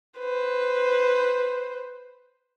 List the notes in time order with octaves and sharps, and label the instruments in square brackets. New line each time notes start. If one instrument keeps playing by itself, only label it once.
[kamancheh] B4 C5